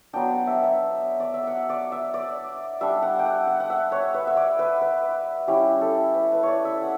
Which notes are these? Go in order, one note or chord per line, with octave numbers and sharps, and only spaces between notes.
F#3 B3 D4 G5
F#5
E5
E5
D5
E5
F#5
D5
E5
D5
G3 D4 E5
F#5
G5
F#5
F#5
F#5
E5
C#5
B4
E5
D5
B4
B4
G3 C#4 E4 G4
A4
B4
B4
C#5 D5
E5
F#5